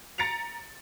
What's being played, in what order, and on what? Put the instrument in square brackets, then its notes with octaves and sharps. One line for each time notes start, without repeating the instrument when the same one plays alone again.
[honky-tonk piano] A#5 A6 C#7 D7 F7